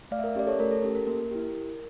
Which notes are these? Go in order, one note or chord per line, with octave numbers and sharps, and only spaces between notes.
A3 D5 F5
E5
A#4 D5
C#4 G4 D5
A4 C#5
A3 A#4
A4
C#4 G4 A4
A#4
A#3 A#4
E4 G4